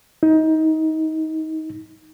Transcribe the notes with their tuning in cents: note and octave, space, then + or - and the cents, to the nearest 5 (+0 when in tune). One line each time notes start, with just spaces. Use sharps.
D#4 +25